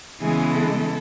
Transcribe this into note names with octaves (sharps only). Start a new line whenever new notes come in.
C#3 E3 G#3 B3 G#4
A4